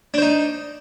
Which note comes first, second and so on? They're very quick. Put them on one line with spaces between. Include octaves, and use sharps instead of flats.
D4 C5 D#4